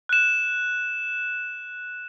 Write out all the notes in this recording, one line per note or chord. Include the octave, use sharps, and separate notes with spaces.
F#6 E7